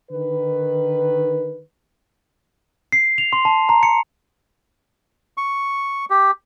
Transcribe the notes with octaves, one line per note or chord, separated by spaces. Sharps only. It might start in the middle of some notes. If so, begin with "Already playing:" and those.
D3 D#3 B4
C7
F7
C6
A5
A#5
C#7
C#6
G4